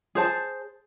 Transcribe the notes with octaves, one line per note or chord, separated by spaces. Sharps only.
G#4 C5 A5